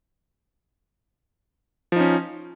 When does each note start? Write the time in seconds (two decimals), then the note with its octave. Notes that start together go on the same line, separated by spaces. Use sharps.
1.92 F3
1.96 D#4
2.00 C#4